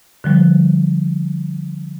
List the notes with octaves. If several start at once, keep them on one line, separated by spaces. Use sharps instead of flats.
D3 F3 G3